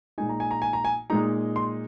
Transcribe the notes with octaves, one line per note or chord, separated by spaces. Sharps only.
A#2 G#3 D#4 G#5
A#5
G#5
A#5
G#5
A#5
G#5
A#2 G#3 D#4 A#5
C6